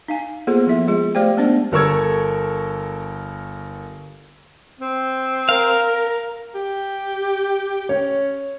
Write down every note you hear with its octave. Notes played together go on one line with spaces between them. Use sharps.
D#4 F5 G#5
A#3 B3 F4 G#4 A4 C5
F3 A#3 B3 E4 E5
G#3 F4 G#4
A3 G4 C5 D5 G5
G#3 B3 C#4 D4 C5 D5
G1 A4 A#4 C#6 E6 G#6
C4
A#4 F5
G4
C#4 C#5